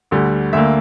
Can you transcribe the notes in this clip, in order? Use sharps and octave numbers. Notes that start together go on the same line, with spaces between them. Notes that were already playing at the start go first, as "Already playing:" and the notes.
D2 D3 G3
D2 D3 A#3 E5